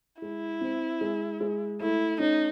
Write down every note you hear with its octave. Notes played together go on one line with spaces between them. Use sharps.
G#3 E4
C4
G#3
G#3
A3 E4
C#4 D#4